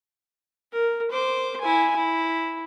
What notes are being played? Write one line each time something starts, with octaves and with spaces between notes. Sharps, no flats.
A#4
C5 D6
E4 G#5
E4